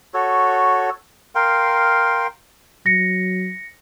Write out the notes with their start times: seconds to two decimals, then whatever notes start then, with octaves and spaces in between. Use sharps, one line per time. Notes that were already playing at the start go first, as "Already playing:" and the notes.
0.14 F#4 A4 C#5
1.35 A#4 F5 G5 C6
2.86 F#3 A#6 C#7